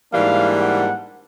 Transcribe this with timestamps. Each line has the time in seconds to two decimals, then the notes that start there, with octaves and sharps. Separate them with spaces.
0.12 G#2 E3 G3 A#3 D4 F5
0.60 F#5